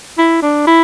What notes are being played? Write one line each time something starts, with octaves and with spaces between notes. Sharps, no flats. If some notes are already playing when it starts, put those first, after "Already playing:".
E4
D4
E4